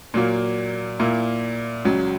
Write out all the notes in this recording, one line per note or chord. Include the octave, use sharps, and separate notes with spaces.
A#2 F#3 A#3
A#2 A#3 E4
C#2 C#3 F#3